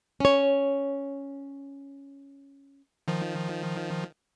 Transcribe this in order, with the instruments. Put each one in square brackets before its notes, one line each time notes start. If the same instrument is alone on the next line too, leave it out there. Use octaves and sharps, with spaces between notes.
[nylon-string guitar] C#4 C#5
[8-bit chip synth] D#3 F3